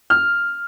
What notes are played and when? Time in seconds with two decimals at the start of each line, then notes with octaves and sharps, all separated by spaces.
0.10 F6